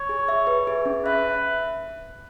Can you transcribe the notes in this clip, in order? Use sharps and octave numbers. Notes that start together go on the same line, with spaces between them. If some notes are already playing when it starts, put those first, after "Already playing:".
Already playing: C#5
G#4
E5
B4
G#4
C#4
B4 E5